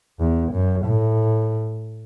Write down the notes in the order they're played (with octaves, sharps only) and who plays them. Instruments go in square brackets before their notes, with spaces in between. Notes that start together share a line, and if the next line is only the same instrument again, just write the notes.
[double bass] E2
F#2
A2